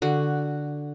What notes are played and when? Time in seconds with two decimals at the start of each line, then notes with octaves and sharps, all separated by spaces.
0.02 D3 F#4